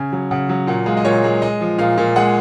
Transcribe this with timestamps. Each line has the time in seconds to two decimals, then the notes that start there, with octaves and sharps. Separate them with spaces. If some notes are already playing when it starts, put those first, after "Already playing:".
Already playing: C#3 G#5
0.12 F#3
0.31 C#3 F#5
0.49 F#3
0.67 A#2 F#5
0.86 G#3 F5
0.97 D#5
1.04 A#2 C#5
1.24 G#3
1.42 G#3 D#5
1.61 F3
1.78 A#2 F5
1.98 A#2
2.16 G#3 F#5